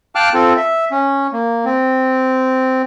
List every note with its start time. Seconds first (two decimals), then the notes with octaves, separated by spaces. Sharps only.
0.15 F5 G5 A5 D6 F6 F#6
0.34 C4 F4 A4
0.57 E5
0.92 C#4
1.33 A#3
1.65 C4